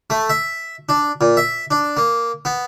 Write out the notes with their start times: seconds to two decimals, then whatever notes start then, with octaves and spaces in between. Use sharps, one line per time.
0.10 A3
0.30 E5
0.89 D4
1.21 A#2
1.37 E5
1.71 D4
1.97 A#3
2.45 B3